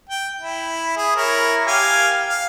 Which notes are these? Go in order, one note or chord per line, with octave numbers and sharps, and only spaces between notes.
G5
E4
G#4
E4 A#4 C#5
G4 F5 G#5
F5